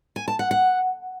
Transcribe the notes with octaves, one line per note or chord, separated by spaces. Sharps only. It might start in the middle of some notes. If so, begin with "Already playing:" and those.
G#5
A5
F#5
F#5